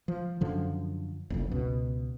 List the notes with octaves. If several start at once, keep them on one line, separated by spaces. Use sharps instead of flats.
F3
F#2 D3 F3
F#1 C2 F2
C#2 B2